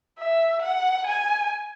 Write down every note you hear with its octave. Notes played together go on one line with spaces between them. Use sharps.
E5
F#5
G#5